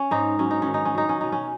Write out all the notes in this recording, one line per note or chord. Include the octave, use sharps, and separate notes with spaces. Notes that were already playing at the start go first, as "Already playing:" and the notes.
Already playing: C#4
G#2 D#4
F#3 C#4
D#4
D#3 C#4
D#4
C#4
F#3 D#4
C#4
B2 D#4
C#4